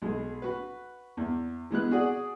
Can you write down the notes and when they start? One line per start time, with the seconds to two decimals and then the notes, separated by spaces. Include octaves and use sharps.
0.02 B1 G#3
0.42 F#4 B4
1.17 E2
1.71 E3 G#3 B3 F#6
1.91 F#4 G#4 D5 F#5